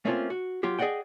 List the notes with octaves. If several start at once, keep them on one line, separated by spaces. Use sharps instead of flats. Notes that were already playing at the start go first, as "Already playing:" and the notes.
A3 A#3 C4 C#4 F4
F#4
F#3 F4 G4
G#4 D5 D#5 F#5 G5